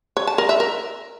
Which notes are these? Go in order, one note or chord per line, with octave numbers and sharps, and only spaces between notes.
C#5
A5
A#4
E5
A#4